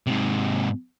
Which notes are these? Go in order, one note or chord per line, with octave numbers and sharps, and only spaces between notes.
G#2 C3